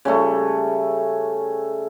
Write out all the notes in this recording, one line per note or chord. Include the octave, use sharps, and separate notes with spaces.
C#3 G3 A3